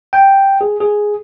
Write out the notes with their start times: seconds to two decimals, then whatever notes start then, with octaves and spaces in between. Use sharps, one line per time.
0.13 G5
0.61 G#4
0.80 G#4